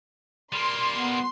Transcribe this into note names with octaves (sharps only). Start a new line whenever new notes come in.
G3 A#3 C6
B3